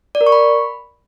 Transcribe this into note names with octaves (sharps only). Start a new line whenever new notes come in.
D5
A#4
C#6
B5